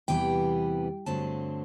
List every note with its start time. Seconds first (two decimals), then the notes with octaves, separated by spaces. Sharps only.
0.08 E2 C3 E3 G3 B3 G5
1.06 G2 D3 F#3 A3 C4 A5